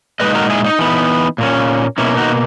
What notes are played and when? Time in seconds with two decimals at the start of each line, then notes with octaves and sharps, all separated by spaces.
0.20 A#2 G#3 D#4 B4 D#5
0.35 F#4 A#4
0.50 E4 G#4
0.64 D#4
0.79 E3 B3 D#4
1.38 A#2 A#3 C#4
1.98 B2 A#3 C#4 E4
2.17 D#4 F#4